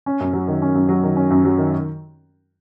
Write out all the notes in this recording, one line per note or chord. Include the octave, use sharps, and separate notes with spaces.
C#4
F#2
F#3
D#3
C#4
F#2
F#3
D#3
C#4
F#2
F#3
D#3